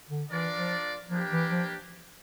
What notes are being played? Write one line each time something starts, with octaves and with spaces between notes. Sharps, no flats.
D3
E3 D4 F4 A#4 D5
F3
F3 A#3 D4 G4 B4
E3
F3